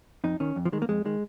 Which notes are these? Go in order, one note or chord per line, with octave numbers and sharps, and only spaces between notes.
F2 D#4
D#3 C#4
F2
F3
D#3 G#3
A#3
F2 G#3
D#3 G#3